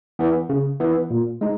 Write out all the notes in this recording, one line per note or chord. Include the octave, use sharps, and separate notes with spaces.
E3 B3 E4 B4
C#3
E3 B3 E4 B4
A#2
G#3 D#4